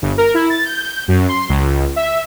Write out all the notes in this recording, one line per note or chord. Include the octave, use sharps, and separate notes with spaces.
G1
A#4
E4
A6
G6
F#2
C6
C#2
E5